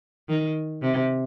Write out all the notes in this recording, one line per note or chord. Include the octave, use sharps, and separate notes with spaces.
D#3
C3